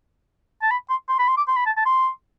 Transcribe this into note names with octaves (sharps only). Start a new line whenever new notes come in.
A5
B5
C6
C6
B5
C6
D6
C6
B5
A5
A5
C6